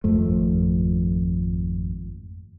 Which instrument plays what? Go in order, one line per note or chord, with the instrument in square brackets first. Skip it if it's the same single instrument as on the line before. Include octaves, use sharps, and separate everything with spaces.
[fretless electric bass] G#1 F2 F3 A3